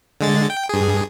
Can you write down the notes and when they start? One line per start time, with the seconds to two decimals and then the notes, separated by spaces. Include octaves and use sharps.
0.21 D3 G#3 A6
0.50 G5
0.69 G2 G#4